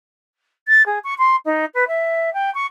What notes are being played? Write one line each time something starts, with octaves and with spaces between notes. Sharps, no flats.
A6
G#4
C#6
C6
D#4
B4
E5
G5
C#6